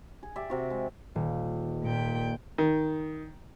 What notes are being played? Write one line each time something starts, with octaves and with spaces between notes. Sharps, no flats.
G#4
G4 D5 E5
C3 F#4
G#3
D#1
A#2 G5
D#3